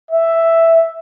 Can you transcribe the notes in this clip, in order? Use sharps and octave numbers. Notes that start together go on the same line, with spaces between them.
E5